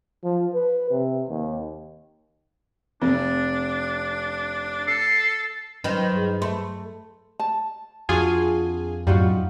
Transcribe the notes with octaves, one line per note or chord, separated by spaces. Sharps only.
F3
B4
C3
D#2
F1 C4 D4
A4 C7
D#3 F#3 G3 B4 C5
G2 G#4
A3 E5 B5 C6
A5
F2 D4 F4 F#4 G#4 G#5
F#2 A2 G3 D#4 F4 F#4